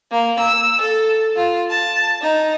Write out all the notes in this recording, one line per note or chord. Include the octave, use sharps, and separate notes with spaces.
A#3
E6
A4
F4
A5
D#4